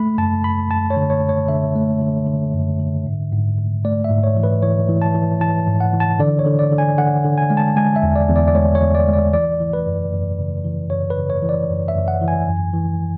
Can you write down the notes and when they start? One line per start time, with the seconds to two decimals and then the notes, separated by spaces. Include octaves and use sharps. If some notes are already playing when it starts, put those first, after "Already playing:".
Already playing: A3 B5
0.18 F#2 A5
0.44 F#2 B5
0.70 F#2 A5
0.90 C#5
0.97 D3
1.10 C#5
1.23 F#2
1.29 C#5
1.48 D3 E5
1.76 A3
2.01 D3
2.27 D3
2.54 F#2
2.80 D3
3.06 G#2
3.32 G#2
3.58 G#2
3.85 A3 D5
4.04 E5
4.11 G#2
4.24 C#5
4.37 E3
4.43 B4
4.63 E3 C#5
4.89 E3
5.02 A5
5.15 E3
5.41 E3 A5
5.68 G#2
5.80 F#5
5.93 E3
6.00 A5
6.19 D3 D5
6.39 C#5
6.46 D3
6.59 D5
6.72 D3
6.78 G#5
6.98 D3 F#5
7.24 D3
7.38 G#5
7.50 G#3
7.57 A5
7.76 G#3 G#5
7.96 E5
8.03 E2
8.16 D5
8.29 E2
8.36 D5
8.48 D5
8.55 G#3 C#5
8.75 C#5
8.81 E2
8.95 D5
9.08 G#3
9.13 D5
9.33 E3 D5
9.60 E3
9.73 B4
9.86 F#2
10.13 F#2
10.38 C#3
10.64 E3
10.90 F#2 C#5
11.10 B4
11.17 C#3
11.30 C#5
11.43 E3
11.49 D5
11.69 F#2
11.88 E5
11.95 F#2
12.08 F#5
12.21 E3
12.28 G#5
12.47 F#2
12.74 E3